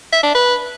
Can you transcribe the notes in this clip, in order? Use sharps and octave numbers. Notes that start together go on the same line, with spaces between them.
E5
D4
B4